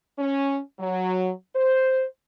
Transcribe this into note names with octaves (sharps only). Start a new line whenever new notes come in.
C#4
F#3
C5